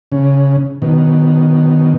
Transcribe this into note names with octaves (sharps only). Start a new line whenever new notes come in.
C#3
B2 D#3